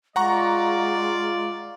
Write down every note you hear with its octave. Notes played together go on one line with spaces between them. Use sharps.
G#3 F4 D5 F#5 A#5 C#6